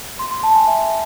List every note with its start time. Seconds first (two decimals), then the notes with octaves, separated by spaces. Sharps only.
0.19 C6
0.31 C6
0.43 A5
0.55 G#5
0.67 E5